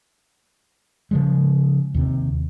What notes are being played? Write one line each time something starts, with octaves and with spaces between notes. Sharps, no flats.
C#3 F3 G#3
D#2 C3 C4